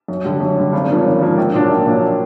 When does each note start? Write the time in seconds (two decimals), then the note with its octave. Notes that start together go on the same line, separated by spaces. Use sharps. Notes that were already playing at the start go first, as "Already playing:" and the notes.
0.08 F#2
0.24 D3 G3
0.40 F#2
0.57 D3 G3
0.72 G#1
0.89 G#2 F3 A#3 C#4
1.05 G#1
1.21 G#2 F3 A#3 C#4
1.38 A#1
1.54 A#2 F#3 A#3 D4
1.69 A#1
1.86 A#2 F#3 A#3 D4